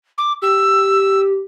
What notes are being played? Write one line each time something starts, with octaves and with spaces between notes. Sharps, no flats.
D6
G4 E6